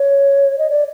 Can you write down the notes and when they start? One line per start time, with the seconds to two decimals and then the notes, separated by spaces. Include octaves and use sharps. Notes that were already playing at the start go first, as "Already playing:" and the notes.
Already playing: C#5
0.58 D#5
0.70 D5